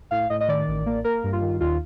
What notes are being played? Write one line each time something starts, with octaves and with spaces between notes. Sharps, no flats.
A2 F5
A2 D#5
D#5
D#3 D5
A1
A#3
A#3 A#4
G2
F4
D#3
D#2 F4